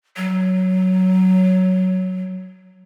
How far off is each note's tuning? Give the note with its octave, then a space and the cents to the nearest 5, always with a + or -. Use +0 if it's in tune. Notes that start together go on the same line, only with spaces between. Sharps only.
F#3 +5